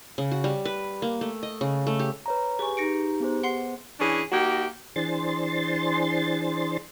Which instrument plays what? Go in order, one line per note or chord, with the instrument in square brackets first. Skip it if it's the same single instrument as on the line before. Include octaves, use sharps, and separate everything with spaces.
[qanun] C#3
F#4
G3
B4
A#3
A3
D#5
C#3
A3
G4
[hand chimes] B4 C#5 A#5
[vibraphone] G4 G#5 [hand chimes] G#4 [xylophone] B4 C#6
[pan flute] D#4 [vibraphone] G4 [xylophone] A#6 C#7 D7
[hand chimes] B3 G#4 C5
[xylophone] F#5 C6 C7
[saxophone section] E3 C#4 D4 G#4
A#3 D#4 F#4 G4
[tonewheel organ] E3 D4 G#4 C5 C6 A6